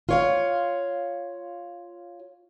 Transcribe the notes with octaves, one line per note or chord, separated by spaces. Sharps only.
F4 C#5 F5